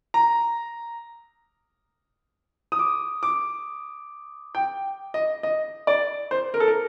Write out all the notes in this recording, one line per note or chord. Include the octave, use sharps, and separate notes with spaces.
A#5
D#6
D6
D6
G5
D#5
D#5
D5
C5
A#4
A4
A#4